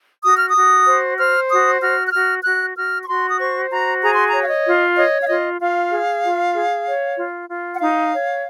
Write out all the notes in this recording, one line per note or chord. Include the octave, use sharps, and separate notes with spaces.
F#4 D#6
F6
D#6
F#4
C5
C5 F6
F#4 D#6
F#4 F6
F#6
F#4 F6
F#4 F#6
F#4 F6
C#6
F#4 C6
D#6
C5 C#6
F#4 A#5
G#4 A#5
C6
A#5
C#5
F5
D#5
F4
C#5 D#5
F5
F4 D#5
F4 F5
G#4
F4
G#4
C#5
F4
F4
F#5
D#4 F5
C#5